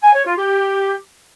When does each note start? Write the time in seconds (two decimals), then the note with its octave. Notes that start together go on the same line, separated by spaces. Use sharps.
0.03 G#5
0.14 C#5
0.26 F4
0.38 G4